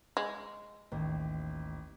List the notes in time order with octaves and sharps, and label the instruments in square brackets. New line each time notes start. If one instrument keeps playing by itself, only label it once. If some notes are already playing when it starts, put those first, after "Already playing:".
[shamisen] G#3
[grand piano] A1 [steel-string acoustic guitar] D#2